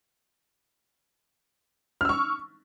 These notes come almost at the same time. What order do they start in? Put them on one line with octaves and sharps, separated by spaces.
F6 E6 C#6